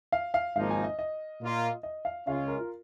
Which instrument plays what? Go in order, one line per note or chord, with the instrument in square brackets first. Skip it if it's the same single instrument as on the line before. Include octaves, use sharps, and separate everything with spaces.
[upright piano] F5
F5
[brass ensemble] G#1 G#2 F3 A#3 D#4 [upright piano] F5
[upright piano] G#5
D#5
D#5
[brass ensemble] A#2 A#3 F4
[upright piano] D#5
F5
[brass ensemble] C#2 C#3 G#3 C#4 F4 [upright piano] F5
[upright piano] A#4
F4